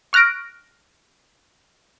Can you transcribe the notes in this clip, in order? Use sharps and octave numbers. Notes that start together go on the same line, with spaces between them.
C#6 F6 F#6 A#6 D7